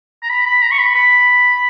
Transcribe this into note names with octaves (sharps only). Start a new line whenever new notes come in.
A#5
B5
B5
A#5
C#6
B5
B5